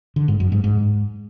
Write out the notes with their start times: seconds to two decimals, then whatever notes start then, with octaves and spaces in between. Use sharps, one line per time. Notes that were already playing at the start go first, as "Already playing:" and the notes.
0.16 D3
0.28 G#2
0.40 F#2
0.52 G#2
0.64 G#2